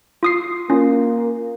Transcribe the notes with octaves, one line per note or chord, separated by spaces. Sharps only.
F4 D#6 C7
A#3 C#4 F4